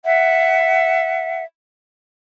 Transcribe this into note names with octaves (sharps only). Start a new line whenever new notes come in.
E5 F#5